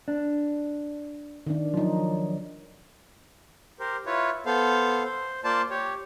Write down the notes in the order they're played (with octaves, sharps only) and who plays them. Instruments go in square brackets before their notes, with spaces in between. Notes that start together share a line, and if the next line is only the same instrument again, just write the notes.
[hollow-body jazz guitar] D4
[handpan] D#3 D4
[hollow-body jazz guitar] F3 [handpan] F#3 D#4
[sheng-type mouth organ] G4 A#4 C5
E4 F4 B4 C#5
B3 A4 C5 F5
C5
A#3 F4 C5 D5 A5
G4 C#5